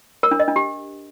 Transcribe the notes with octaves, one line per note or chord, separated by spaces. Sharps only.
A#4
D4
D#5
D4
G4